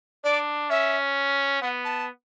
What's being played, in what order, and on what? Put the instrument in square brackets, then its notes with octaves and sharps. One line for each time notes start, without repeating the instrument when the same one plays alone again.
[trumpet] D4 [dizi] D5
[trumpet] C#4 [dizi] E5
[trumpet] B3 [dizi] F#5
[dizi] A5